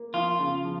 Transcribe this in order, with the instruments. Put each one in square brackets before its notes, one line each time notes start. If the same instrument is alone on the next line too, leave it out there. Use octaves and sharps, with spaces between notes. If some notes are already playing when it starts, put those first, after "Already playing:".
Already playing: [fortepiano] A#3
[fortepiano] F3 [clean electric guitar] F4
[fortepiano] C#3
F3